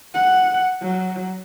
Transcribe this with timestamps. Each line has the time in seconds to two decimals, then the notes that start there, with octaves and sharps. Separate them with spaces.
0.14 F#5
0.82 F#3